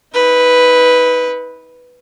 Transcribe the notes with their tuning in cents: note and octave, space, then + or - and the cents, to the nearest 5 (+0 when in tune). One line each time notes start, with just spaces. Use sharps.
D#4 +45 B4 +0